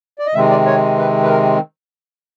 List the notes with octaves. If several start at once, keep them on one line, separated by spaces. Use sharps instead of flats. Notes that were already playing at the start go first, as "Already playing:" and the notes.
D5
D#5
C3 D#3 G#3 C4 E5
D5
C#5
B4
B4
A#4